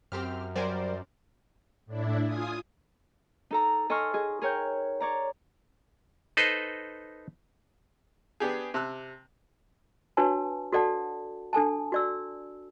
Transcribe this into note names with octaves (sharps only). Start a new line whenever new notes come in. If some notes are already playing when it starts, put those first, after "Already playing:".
F#2 C4 G4 F6
F#3 G3 A#4 C5 D5 G#5
A2 D4 E4
F4 G#5 D#6
D#4 A4 A#5
A4 D#5 G#5 C6 C#6 F6
G#4 D#5
G#4 A#4 C#5 G5 G6
C#5 D5 A#5
D#4 A4 B4 C5 D#5
B3 D4 G4 G#4
C3 A5 E6 F#6
D4 F#4 B4 C#5 G#5 A5
F#4 A4 D5 F#5 A5
D4 A4 G#5 A5
F#4 D5 E6